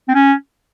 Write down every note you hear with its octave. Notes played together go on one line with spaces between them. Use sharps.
C4
C#4